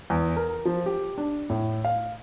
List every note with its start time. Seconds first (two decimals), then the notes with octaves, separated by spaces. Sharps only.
0.10 E2
0.36 A#4
0.65 F3
0.86 G4
1.18 D4
1.50 A2
1.85 F5